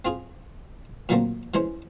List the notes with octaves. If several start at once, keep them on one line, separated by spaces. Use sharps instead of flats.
C4 F4 G#4
A#2 D3 F#3 A3 A#3 C4
E3 G#3 C#4 C5